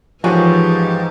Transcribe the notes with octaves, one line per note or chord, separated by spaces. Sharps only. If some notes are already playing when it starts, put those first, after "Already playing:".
G#2 E3 F3 A#3 C#4 F#4 G4